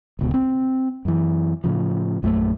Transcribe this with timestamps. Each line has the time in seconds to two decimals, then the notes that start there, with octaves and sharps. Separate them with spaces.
0.19 D1 C#2 B2
0.34 C4
1.05 F#2 E3
1.64 A2 C#3 F3
2.23 A#1 F#2 F#3 A3